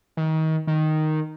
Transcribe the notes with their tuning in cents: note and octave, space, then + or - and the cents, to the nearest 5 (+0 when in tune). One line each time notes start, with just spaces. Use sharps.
D#3 +30
D#3 -5